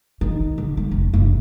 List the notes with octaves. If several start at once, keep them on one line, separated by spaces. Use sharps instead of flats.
D#3
D3
G3
F1
F#1